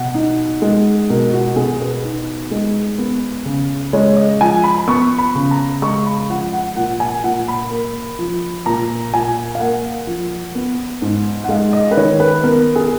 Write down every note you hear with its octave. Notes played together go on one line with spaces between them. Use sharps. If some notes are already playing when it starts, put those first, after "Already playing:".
Already playing: B2 F#5
D#4
G#3
B2 A#4
F#4
B2 G#4
B4
D#4
G#3
B3
C#3
G#3 C#5
D#5
F3 G#5
B5
B5
B3 C#6
B5
C#3
A#5
G#3 C#6
B5
F3 F#5
F#5
A#2 F#5
G#5
A#2 F#5
B5
A#3
F3
A#2 A#5
A#2 G#5
F5
A#3 F#5
F3
B3
G#2
F#5
G#3 F5
D#5
B4
D#3 C#5
B4
B3 A#4
G#4